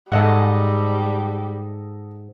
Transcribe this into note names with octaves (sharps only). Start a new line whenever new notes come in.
G#2 G3 A4 D#5 F#5